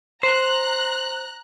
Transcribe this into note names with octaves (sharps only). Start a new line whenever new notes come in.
C5 A#5 F#6